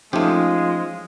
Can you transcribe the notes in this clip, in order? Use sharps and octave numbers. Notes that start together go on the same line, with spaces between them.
F3 G#3 A3 C#4 D#4 G4